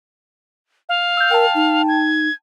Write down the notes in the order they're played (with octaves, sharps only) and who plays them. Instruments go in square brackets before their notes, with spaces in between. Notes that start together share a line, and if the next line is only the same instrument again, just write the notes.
[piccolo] F5
[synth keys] E6 G6
[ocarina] A#4 [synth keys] G5 A5
[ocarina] D#4
[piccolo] G#6